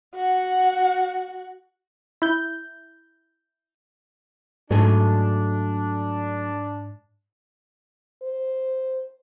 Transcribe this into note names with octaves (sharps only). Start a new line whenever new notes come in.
F#4 F#5
E4 G6
G#2 F#3 A3 D4 G#4
C5